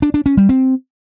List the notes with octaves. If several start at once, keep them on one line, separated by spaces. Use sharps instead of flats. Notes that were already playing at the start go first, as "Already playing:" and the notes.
D4
D4
C#4
G3
C4